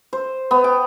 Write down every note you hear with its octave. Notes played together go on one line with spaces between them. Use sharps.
C5
B3
G5